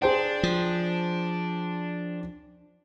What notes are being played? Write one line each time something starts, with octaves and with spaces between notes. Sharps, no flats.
D4 G#4 C5 G5
F3